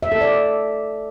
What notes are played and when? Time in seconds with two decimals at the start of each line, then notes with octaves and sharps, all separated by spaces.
0.03 E5
0.12 A4
0.21 D5